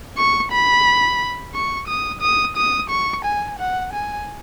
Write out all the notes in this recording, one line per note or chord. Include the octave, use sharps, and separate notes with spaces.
C#6
B5
C#6
D#6
D#6
D#6
C#6
G#5
F#5
G#5